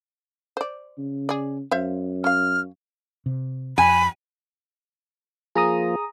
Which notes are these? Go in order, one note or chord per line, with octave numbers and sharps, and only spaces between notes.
C5 D5
C#3
G#4 D5
F#2 C5 E5 F5
C#4 F5 F6
C3
F2 G#5 B5
F3 A#3 F4 G#4 A#5 D#6